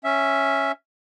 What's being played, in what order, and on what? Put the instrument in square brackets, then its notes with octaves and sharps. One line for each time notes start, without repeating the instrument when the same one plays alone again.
[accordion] C#4 E5